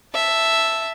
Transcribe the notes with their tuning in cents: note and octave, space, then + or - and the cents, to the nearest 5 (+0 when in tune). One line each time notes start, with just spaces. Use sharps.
E5 +0 A5 +0